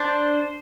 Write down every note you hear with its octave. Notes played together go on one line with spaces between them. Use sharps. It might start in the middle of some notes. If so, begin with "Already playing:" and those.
Already playing: D4 C5